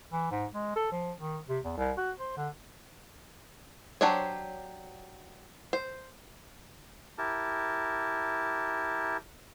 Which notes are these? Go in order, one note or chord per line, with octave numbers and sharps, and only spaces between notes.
E3
G#2
G#3
A4
F3
D#3
C3
E2
C2
F#4
C5
D3
F#3 D4 G4 C5 C#5
C5
E4 G4 A#4 A5